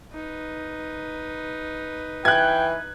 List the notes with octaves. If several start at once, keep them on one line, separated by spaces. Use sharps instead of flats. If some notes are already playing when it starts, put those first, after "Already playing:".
D#4 B4
E3 G5 F#6 G#6